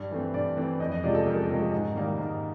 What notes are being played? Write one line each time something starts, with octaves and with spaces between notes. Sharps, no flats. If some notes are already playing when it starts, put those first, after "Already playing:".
Already playing: G2
E3 A3 C4
G2 D5
E3 A3 C4
F2 D#5
D#5
C3 F3 G#3 C#4 D5
A4
F2 A#4
A4
A#4
C3 F3 G#3 C#4
G#2
D#3 G3 A#3 D#4
G#2